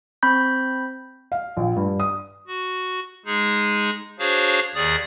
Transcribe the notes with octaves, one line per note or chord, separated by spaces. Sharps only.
C4 B5 G6
F5
A#1
G2
D#6
F#4
G#3 D#4 G#4
D4 F#4 G#4 C5 C#5 F5
D#2 D#3 G#4 D5 D#6